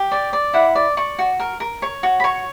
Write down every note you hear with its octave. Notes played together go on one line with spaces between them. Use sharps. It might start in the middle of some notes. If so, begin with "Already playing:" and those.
Already playing: G4
D5
D5
E4 F#5
D5
D5 C#6
F#4
A#4
A#4
C#5
F#4
B5
C#5 C#6